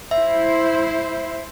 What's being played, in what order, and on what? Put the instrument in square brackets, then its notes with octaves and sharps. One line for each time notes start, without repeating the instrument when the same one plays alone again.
[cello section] E4 C5 [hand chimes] E5